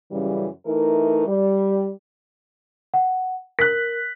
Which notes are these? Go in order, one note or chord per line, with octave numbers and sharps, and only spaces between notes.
F#2 C#3 E3 G3
E3 A3 D#4 A#4
G3
F#5
A#4 F#6 B6